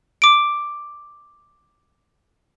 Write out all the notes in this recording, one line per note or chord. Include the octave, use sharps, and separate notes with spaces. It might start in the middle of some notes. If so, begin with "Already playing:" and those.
D6 D7